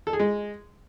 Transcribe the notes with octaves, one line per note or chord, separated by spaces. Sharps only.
A4
G#4
G#3